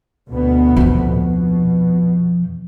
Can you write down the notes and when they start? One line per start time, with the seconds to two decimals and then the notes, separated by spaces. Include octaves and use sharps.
0.29 D2 B2 B3
0.77 F2 F3
1.15 B2